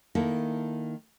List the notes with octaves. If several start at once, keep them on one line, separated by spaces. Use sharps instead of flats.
D#3 A#3 E4 A4